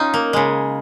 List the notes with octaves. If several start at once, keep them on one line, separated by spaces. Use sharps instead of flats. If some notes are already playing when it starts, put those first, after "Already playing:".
Already playing: C#4 D#4 F4
A#3
C#3 G#3